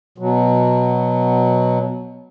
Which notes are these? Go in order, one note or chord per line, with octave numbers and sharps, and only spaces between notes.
B2 F#3